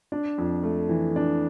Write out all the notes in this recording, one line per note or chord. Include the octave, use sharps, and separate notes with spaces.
D4
F2
A3
E3
D4